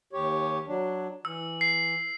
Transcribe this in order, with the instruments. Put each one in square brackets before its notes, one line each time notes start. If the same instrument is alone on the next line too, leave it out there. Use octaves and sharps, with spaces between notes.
[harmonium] D#2 G4 C#5
F#3 D4
[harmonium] E3 [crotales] E6
[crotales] C7